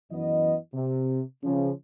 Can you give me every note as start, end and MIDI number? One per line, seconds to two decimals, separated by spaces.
0.12 0.56 42
0.12 0.56 52
0.12 0.56 59
0.12 0.56 75
0.74 1.22 48
1.43 1.70 49
1.43 1.70 53